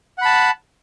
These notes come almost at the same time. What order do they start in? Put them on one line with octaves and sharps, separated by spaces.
F#5 B5 A5